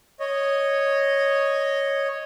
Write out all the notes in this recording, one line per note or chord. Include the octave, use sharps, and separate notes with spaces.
C#5 D#5